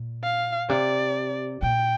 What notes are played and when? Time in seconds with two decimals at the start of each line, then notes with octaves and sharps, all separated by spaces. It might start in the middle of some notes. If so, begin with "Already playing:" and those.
Already playing: A#2
0.24 F5
0.69 C3 D5
1.62 A#2 G5